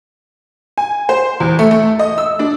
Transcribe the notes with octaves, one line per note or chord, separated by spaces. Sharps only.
G#5
C5
E2
A3
A3
D#5
E6
D4